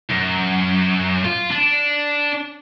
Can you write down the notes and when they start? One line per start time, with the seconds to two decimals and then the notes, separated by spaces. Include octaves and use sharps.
0.10 F#2
1.25 F4
1.51 D4